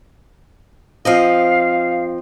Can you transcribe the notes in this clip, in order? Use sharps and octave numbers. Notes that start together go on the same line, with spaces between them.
F3 C4 D#5 F5